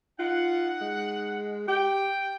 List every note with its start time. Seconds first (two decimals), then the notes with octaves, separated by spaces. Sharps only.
0.19 D#4 F4 F#5
0.81 G#3
1.68 G4 G5